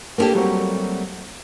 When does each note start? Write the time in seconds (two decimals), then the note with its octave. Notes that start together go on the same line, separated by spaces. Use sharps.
0.18 A#3 B3 D4 G4 A4
0.35 F#3 G3 A3 A#3 C4 F#4